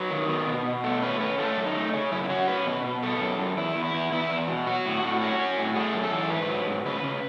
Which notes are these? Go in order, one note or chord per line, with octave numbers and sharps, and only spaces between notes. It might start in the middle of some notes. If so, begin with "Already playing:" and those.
Already playing: F#3 B4
D#3
B3
B2
B2
A3 A4
C#4 B4
C#4 B4
A3 A4
F#2
D#4
A3
C#3 C#4
F#2 E4
E4
C#4 F#4
C#4 B4
B2
B2
B3 A4
F#2
F#2
E2 E4
E2
E4
E2
E2 E4
E2
B2
F#3 F#4
A2
A2
C#4 F#4
C#4
A2
A3 G#4
F#2
A4
E3
G#2 B4
F#3
G#2
C#3 B4
C#3